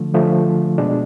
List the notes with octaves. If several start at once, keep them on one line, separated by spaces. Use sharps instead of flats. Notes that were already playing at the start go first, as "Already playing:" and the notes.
Already playing: D3 F3 A3
D3 F3 A3
B2 G#3 D4